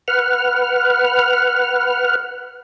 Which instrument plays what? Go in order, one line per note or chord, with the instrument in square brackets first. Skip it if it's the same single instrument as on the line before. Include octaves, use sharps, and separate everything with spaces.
[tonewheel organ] B4 F#5 F6